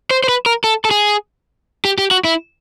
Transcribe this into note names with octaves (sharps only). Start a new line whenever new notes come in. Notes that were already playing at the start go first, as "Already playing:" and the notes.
C5
C5
B4
A#4
A4
A4
G#4
G4
G4
F#4
E4